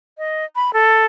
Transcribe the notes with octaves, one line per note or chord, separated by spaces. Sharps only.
D#5
B5
A4